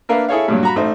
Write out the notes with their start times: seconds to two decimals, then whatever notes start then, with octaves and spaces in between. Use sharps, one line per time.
0.09 A#3 D4 A#4 B4 E5 F5
0.28 E4 G#4 A4 C#5 F5
0.48 G2 A#2 F#3
0.63 F#4 A#5 B5
0.76 A1 A3 D#4 C5